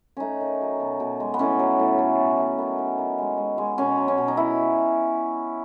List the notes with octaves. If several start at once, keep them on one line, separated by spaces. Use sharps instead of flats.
A3 C#4 D#4
D#3
F#3
B2
B2
G#3
B3
A2 C#4
F#3
A2
A3
B2
A3
D#3 B3
D#3
D#3
G#3
G#3
G#3
B2 C#4
F#3
C#4
B2
D#4
D#3 E4